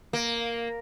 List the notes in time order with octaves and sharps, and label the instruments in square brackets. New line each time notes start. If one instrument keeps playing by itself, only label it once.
[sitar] A#3